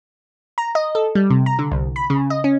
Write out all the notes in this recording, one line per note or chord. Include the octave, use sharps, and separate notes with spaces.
A#5
D#5
A4
G3
C3
A#5
D3
C2
B5
C#3
D#5
C#4